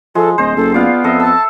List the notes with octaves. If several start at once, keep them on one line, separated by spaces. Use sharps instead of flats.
F3 G#3 A4
D1 C5 D#5
F#1 A4
B3 F4 D5 F5
F2 A4 D#5 E5
A5 E6